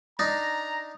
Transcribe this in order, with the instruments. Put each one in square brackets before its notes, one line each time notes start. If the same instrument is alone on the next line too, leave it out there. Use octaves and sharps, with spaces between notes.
[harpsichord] D4 D#4 [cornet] A#5